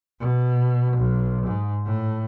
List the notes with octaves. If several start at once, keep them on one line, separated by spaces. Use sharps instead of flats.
B2
B1
G#2
A2